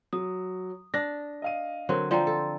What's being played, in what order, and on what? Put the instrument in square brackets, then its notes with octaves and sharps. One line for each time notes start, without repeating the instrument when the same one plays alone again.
[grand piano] F#3 [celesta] D#6
[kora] D4 [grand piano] A#6
[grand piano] D#5 F5 D#7
[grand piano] D3 [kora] F#3 C4 [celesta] A#4 C#5
[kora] F3 C4 [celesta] D5 G5 A#5
[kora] A4